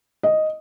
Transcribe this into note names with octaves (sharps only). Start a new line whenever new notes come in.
D#5